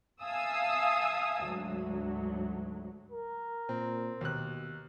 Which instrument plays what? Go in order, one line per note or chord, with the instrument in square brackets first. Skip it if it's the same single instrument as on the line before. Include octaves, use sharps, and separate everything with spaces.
[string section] E5 F5 G#5 A5 D#6 E6
D2 G#2 F#3
[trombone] A#4
[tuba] A#2 [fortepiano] C4
[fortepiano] D#2 F#6 [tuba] B2